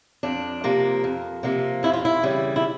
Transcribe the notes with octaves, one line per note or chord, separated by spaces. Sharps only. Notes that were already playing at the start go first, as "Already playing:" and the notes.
F2 D4
C3 F3 A#3
F2
C3 F3 A#3
F2 E4
F4
E4
C#3 E3 G3
E4